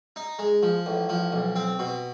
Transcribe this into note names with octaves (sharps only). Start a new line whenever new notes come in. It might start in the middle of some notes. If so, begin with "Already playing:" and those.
D#4
G#3
F3
A1
F3
B1
C4
B2